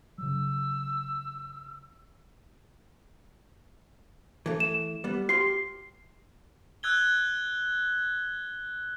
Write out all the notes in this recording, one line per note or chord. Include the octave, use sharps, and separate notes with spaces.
C#3 F#3 E6
E3 A3
E7
G3 B3
F4 G4 C6 C7
E6 F#6 G#6 G7